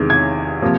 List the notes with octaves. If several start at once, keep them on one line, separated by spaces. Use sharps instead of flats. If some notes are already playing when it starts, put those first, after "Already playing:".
Already playing: E2 C3 D#3 G#3
G#6
C3 F3 A#3